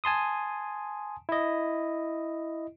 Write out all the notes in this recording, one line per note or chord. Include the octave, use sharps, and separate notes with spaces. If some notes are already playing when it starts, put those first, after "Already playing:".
G#5 A5 C6 D#6
E4 D#5